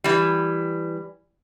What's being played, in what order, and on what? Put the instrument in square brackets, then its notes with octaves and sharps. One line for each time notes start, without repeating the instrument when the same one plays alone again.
[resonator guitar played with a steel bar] E3 G3